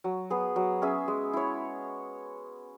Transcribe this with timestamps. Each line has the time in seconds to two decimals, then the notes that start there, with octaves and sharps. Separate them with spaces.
0.04 F#3
0.30 B3 G#4
0.56 F#3
0.82 C#4 G#4 E5
1.08 G#3
1.33 E4 C#5